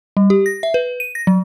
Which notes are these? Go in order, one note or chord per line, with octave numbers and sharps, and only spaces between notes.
G3
G4
A#6
E5
B4
D#7
A#6
F#3